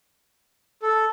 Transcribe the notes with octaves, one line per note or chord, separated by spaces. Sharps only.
A4